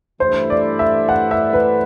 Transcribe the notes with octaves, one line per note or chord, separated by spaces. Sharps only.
G2 E3 A3 E4 C5
D5
E5
F#5
E5
B4